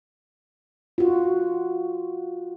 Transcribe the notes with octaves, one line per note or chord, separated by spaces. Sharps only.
F4 F#4